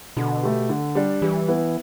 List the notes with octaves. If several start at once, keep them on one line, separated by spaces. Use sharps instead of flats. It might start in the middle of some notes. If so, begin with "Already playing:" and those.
B2 D3
A3 G4
D3
G3 D4 G4
E3 G3
B3 E4